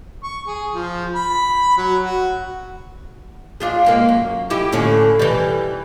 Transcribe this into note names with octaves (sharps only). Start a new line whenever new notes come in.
C#6
G#4
F3
B5
F#3
F#4
D4 F4 G#4
G#2 G#3 A#3
F#2
E4 G4
A2 D3 C#4
E3 G3